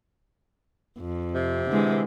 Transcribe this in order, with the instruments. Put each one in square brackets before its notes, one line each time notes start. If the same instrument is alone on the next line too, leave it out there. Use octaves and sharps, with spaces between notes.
[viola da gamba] F2
[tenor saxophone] C3
[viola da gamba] D3 E3 G#3